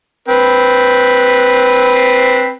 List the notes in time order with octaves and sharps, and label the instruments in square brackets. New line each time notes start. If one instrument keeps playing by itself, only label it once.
[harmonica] C4 B4